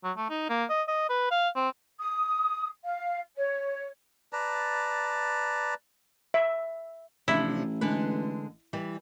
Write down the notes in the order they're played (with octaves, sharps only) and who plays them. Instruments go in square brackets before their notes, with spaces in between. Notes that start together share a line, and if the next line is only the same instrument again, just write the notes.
[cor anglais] F#3
A3
D#4
A#3
D#5
D#5
B4
F5
C4
[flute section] D#6
F5
C#5
[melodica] B4 D5 A5 A#5
[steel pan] E5
[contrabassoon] A1 [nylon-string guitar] C3 F3 D4 [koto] E4
[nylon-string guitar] D3 G#3 B4
E3 G3